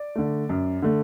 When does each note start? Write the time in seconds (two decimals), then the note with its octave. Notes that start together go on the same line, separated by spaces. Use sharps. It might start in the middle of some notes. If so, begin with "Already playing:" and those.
Already playing: D5
0.15 D3 A3
0.49 F#2
0.82 D3 A3